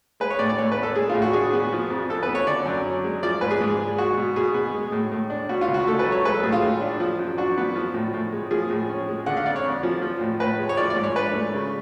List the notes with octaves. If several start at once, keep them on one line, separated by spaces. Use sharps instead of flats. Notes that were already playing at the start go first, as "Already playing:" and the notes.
G#3 B4
C#5
A2 D5
D5
A2 C#5
B4
B3
A4
G#3 G#4
F4
A2
F#4
D4 G#4
B3
F3
F2
F2 A4
B4
B3
C#5
D3 D5
F#2
C#4
G#3
F3 D5
G#2 B4
G#4
G#2
G#3
G#3 F#4
B2
B2 G#4
B3
G#3
A2
A2
D4
B2 F#4
F4
C#2
F#4
A3 A4
B4
F#3
C#5
G#3 B4
A4
A2 G#4
F4
A2
D4
F3
F#2
D4 F#4
B3
F3
A2
A2
G#3
F3 G#4
A2
C#4
G#3
D3 F#5
F5
F2 D5
C#5
F2
F3
F3
A2
A2 B4
G#3
C#5
F3 D5
D5
G#2
C#5
D4 B4
A3
C#3